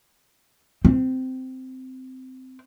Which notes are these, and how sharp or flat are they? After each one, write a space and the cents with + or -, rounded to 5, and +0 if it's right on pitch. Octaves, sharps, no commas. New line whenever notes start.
C4 -15